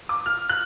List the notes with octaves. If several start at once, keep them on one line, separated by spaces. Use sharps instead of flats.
D6
F6
F#6